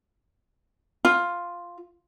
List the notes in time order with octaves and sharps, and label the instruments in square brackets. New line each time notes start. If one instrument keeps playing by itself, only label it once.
[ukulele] F4